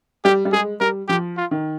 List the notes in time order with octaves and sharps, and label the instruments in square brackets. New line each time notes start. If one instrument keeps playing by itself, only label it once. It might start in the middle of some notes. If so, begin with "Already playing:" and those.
[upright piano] G3 [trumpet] G4
[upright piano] G3
[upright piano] G#3 [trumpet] G#4
[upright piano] G3 [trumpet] A#4
[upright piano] F3 [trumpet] G4
[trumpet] F4
[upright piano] D#3